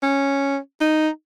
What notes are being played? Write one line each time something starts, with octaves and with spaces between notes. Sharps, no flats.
C#4
D#4